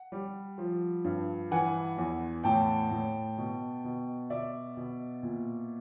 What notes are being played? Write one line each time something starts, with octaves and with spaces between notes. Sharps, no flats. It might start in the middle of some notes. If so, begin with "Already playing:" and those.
Already playing: F#5
G3
F3
G2
E3 F#5 G#5
E2
A2 G5 A5
A2
B2
B2
B2 D5 E5
B2
A#2